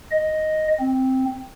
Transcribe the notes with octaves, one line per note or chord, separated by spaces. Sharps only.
D#5
C4